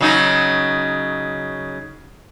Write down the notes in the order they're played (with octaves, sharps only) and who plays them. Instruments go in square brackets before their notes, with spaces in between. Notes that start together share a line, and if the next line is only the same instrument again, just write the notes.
[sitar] C#3 F#3 D#4